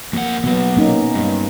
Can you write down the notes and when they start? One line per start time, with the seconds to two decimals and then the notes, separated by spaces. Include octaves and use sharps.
0.13 F2 A#3 F#5
0.44 B2 F#3 B3
0.77 A#3 C#4 D#4
1.15 G2